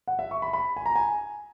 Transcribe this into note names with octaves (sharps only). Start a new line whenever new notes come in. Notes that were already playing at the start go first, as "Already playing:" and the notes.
F#5
E5
C#6
B5
B5
G#5
A#5
G#5